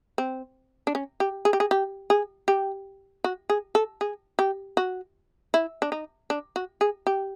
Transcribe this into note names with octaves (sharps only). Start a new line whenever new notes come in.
C4
D4
C#4
G4
G#4
G4
G#4
G4
G#4
G4
F#4
G#4
A4
G#4
G4
F#4
E4
D4
D#4
D4
F#4
G#4
G4